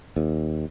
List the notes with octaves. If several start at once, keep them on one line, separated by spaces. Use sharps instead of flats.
D#2